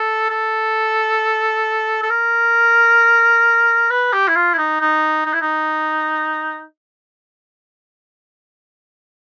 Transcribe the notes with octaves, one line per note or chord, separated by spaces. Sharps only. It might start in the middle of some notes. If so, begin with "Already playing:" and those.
Already playing: A4
A4
A4
A#4
B4
G4
E4
F4
E4
D#4
D#4
D#4
E4
D#4